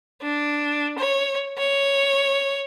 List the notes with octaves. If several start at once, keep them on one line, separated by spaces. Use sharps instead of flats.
D4
C#5
C#5